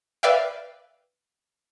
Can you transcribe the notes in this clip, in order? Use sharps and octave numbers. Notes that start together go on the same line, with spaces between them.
B4 D5 E5 F5 G5